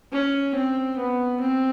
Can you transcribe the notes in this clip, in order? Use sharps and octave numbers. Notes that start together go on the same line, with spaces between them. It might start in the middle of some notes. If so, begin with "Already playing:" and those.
C#4
C4
B3
C4